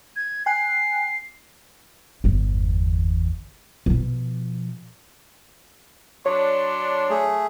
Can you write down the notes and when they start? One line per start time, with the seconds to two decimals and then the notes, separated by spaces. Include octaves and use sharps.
0.16 G#6
0.46 G5 G#5 F#6 C7
2.24 G1 E2
3.86 B2 F3
6.26 F#3 D4 C#5 C6
7.10 A3 G#4